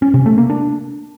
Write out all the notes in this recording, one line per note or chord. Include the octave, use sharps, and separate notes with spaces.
C#4
C3
A3
A#3
D4